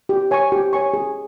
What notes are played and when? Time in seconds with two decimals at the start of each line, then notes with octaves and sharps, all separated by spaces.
0.09 G4
0.31 C#5 G#5 C#6
0.52 G4
0.73 C#5 G#5 C#6
0.94 G#4